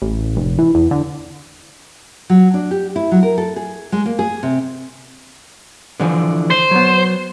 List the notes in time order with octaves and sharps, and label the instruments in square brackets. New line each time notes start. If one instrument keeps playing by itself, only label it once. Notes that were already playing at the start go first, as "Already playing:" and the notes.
[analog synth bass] A1
F1
E3
E2
D3
[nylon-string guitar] F#3
D4
G4
E4
F#3
A#4
A4
G#4
G#3
A#3
G#4
C3
[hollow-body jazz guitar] D3 E3 F3
[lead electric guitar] C5
[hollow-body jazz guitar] F#3 B3